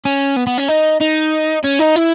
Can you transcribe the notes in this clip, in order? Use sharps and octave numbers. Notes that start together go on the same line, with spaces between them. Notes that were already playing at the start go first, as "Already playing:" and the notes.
C#4
B3
B3
C#4
D#4
D#4
C#4
D#4
E4